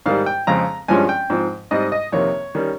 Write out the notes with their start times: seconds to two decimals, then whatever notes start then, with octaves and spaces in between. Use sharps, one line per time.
0.06 G#2 D#3 G3 F5
0.26 G5
0.47 F2 C#3 G#3 C4 A#5
0.88 G2 F3 G#3 C#4 G#5
1.09 G5
1.30 G#2 F3 C4
1.71 G#2 G3 C4 D#5
1.92 D#5
2.12 F2 C3 D#3 A#3 C#5
2.55 D#3 G3 C#4